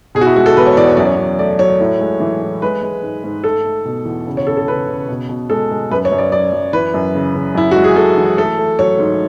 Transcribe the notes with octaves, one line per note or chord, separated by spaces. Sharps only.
B2 G#4
F#4
E4
G#3 F#4
A4
E2 B4
C#5
E2 D5
C#5
F#2 D5
C#5
F#2
A3 D5
F#3 C#5
A2
G#3
E3
A2
G#3 B4
G#3
G#2
G#2
A3 A4
A3
B2
E2
C#3
C#5
C#3 A4
A4
C#3 B4
C#3
B2
B2
G#3 A4
G#3
F#2 B4
C#5
F#2
D5
F#2 D5
F#2
E3 B4
F#2
C#3
C#3
F#2 E4
G#3 F#4
G#4
G#3 A4
E3
A3 A4
A3
F#3 C#5
G#2